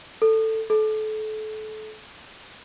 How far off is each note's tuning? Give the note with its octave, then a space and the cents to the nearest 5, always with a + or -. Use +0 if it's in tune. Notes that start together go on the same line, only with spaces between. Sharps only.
A4 +10
A4 -30